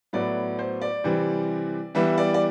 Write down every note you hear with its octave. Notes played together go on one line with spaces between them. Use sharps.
A2 F#3 B3 D5
C5
D5
C3 E3 G3 C4
E3 G3 B3 E5
D5
D5